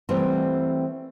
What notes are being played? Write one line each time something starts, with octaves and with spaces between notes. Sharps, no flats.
E3 G3 A3 B3 C4